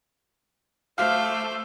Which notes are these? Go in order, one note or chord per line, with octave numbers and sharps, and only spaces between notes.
A3 C5 E5 F5 D6 E6